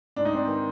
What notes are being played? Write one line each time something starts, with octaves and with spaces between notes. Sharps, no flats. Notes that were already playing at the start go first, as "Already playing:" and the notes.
G#2 D4
D#4
C4 D4
D#3